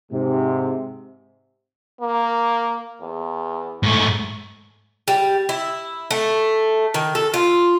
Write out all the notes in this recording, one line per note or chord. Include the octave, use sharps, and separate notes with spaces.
G#2 C3
A#3
E2
G#2 A3
G3
E4
A3
D#3
A4
F4